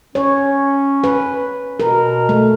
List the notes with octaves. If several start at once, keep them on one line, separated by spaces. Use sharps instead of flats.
C#4 C#5
B4
B2 A#4
A3